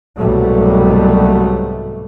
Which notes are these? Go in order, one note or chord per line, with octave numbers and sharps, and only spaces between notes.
C2 G#2 B2 F#3 G3 A3